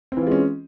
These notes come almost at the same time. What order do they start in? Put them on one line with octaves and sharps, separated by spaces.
C4 E3 F4 G#3 C#4